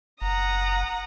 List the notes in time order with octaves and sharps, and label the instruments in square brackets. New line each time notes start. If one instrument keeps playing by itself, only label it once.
[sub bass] F#1 [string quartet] F#5 A#5 D#6